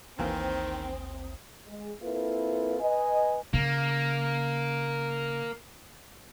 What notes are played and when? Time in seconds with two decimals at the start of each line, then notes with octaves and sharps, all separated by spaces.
0.19 A1 D#2 D#3 E3 A#3 C4
1.67 G#3
2.02 A#3 C4 E4 F4 A4 B4
2.81 B4 D#5 G#5
3.53 C#3 A#3